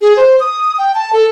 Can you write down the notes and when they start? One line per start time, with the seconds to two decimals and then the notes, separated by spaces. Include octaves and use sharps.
0.01 G#4
0.17 C5
0.40 D#6
0.78 G5
0.95 A5
1.13 A4